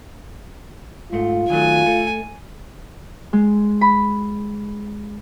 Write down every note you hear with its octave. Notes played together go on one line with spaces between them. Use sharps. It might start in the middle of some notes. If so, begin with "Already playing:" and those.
G#2 A3 F4
D#3 F#3 A3 G#5
A3
G#3
B5